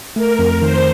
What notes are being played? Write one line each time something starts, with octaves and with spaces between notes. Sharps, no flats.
A3 A#4
F2
D#3 C5